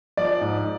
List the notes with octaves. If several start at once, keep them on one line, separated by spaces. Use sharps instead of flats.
F3 D5
G#2